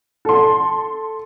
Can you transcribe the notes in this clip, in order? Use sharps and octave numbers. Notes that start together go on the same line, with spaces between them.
A4 C6